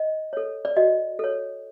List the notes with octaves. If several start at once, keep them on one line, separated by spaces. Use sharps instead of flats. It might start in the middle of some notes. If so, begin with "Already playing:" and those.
Already playing: D#5
A4 C#5
D5
F#4 D#5
A4 C#5